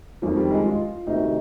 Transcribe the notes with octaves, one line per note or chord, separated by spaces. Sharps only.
F2 D#3 F3
G3
G#3
F4
D2 C3 D#3 D#4